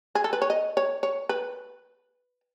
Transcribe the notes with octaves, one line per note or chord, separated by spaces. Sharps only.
G#4
A4
B4
C#5
D#5
C#5
C#5
B4